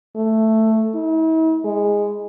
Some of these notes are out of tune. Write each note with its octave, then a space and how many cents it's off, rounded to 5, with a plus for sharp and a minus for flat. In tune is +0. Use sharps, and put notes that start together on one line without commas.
A3 +5
E4 -45
G#3 -10